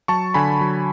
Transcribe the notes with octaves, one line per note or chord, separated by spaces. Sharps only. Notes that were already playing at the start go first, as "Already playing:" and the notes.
F#3 A5 C#6
D3 G#5 B5
F#3